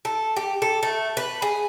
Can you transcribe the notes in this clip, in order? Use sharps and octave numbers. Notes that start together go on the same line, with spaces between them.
A4
G4
A4
A3
B4
G#4